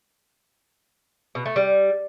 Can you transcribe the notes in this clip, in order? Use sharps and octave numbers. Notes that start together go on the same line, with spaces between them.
B2
A3
G3